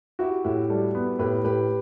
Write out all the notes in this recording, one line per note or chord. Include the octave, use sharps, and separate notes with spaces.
E4 F#4 G4
A2 E4 G4
G3 F#4 A4
B3
A2 G4 B4
A2 G4 B4